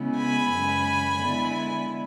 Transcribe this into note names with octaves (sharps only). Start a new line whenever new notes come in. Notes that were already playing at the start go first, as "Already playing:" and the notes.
Already playing: C#3 G#3 B3 E4
G#5 B5
F#2 C#3 G#3
D3 G#3 B3 E4